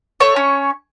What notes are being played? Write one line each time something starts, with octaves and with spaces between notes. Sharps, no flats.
A3 C#5
C#4